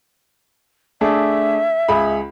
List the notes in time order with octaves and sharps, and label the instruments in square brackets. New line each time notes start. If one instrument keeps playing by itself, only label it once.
[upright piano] A3 D4 G#4 [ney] E5
[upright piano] C#2 G#4 B5